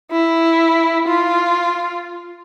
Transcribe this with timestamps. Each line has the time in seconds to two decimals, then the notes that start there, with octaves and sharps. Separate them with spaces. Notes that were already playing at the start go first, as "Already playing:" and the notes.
0.11 E4
1.07 F4